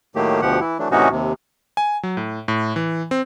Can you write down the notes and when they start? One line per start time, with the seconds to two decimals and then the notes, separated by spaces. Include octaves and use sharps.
0.15 A2 D#3 F#3 A3 A#3 G4
0.42 D2 B2 F3 G4 F#5
0.60 E3 E4
0.79 E3 F#3 A3 D4
0.91 A2 C3 E3 C#4 D#4 F#4
1.11 D#2 C3
1.77 G#5
2.03 F#3
2.17 A2
2.48 A2
2.76 E3
3.11 C4